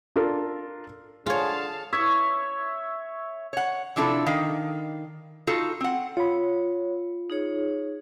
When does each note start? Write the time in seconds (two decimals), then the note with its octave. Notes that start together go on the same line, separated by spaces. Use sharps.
0.16 D4 F4 A4 A#4
1.26 D3 F4 G#4 C#5 F5 A5
1.93 C#5 E5
3.53 C#5 F#5
3.96 C3 F3 D4 E4 G#4 A4
4.26 D#3 F5
5.47 D#4 F4 F#4 A4
5.81 C4 F#5
6.17 F4 C#5 B5
7.30 D#4 G#4 C#5